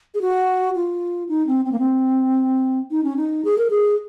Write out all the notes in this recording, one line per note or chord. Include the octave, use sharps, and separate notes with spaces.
G#4
F#4
F4
D#4
C4
C4
A#3
C4
D#4
C#4
D#4
G#4
A#4
G#4